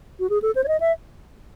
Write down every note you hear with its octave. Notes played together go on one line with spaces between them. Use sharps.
F#4
G#4
A4
C5
C#5
D#5
E5